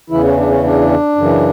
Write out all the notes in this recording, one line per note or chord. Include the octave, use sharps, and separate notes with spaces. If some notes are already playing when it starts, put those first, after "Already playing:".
E2 C#3 E3 E4
C#4
D4
C#4
D4
F#2 C#3 E3